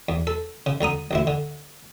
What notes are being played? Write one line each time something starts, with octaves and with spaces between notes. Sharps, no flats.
E2
A4
C#3
C#2 D3 A#5 D#6
A1 D2 E4
D3